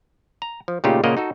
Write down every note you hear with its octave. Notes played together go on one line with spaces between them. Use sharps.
A#5
F3
A#2 C#3 A3 D#4 F4 G4
A#2 C#3 A#3 A#4 D#5 F#5
D#4 F#4 A4